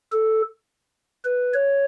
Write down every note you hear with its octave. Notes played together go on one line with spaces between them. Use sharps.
A4
B4
C#5